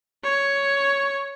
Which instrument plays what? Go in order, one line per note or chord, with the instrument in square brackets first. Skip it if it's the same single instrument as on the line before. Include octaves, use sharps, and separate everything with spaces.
[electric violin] C#5